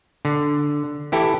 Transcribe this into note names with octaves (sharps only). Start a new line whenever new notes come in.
D3
E3 E4 G4 A4